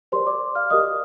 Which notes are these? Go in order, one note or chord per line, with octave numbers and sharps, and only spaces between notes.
G4 A#4 C5 D5 C6
D5 D6
F5 F6
G4 A#4 D5 D#5 D#6